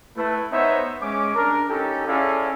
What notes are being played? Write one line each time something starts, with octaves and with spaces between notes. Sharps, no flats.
A3 E4 B4
B3 D#4 C5 C#5 E5
G#3 C#4 D6
D4 A#4
C#4 D#4 G4 A4
C#4 E4 G#4 A4 D5 F5